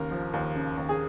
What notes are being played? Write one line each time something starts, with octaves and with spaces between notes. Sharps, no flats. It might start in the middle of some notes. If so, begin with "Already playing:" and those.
Already playing: D#2 C#3 A#4
F3
D#2
C#3
D#2
G#4